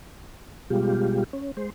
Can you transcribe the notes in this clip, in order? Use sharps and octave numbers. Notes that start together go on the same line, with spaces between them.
B2 G3 G#3 F4 G4
C#4
G#3 C5